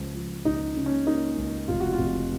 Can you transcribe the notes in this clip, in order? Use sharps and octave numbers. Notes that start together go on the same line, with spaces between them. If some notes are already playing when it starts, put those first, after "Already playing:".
Already playing: C#2 F3
F3
C#2 D#4
C#3
C#4
A#3 D#4
C#2
F1 F4
F#4
F4
F1